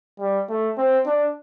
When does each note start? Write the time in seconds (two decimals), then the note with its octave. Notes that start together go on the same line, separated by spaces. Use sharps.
0.20 G3
0.49 A3
0.78 C4
1.06 D4